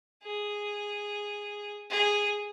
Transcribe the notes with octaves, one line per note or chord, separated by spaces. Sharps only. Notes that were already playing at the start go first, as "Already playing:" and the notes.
G#4
G#4